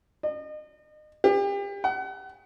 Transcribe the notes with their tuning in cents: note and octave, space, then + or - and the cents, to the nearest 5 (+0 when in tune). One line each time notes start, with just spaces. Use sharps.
D#5 -35
G4 +35
F#5 +35